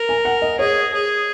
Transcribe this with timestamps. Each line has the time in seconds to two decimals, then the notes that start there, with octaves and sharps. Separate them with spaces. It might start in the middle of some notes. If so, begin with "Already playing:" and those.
Already playing: A#4
0.09 G#5
0.25 F#5
0.42 D#5
0.59 G#4 C#5
0.93 G#4